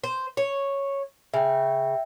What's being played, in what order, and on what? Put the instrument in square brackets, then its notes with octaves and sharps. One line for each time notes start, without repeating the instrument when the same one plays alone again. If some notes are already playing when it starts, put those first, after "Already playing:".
[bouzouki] C5
C#5
[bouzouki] C#3 [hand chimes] E5 G5